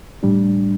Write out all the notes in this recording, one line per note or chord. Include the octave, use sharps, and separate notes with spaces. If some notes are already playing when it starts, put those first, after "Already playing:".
A2 G3 D4